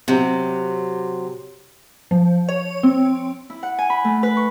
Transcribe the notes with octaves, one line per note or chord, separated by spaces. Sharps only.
C3 F#3
F3
C#5
C4
E4
F#5
G#5
B5
A3
B4
C#6